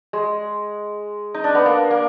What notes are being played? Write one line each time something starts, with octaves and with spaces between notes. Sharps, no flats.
G#3
D#4
D4
B3
A#3
A#3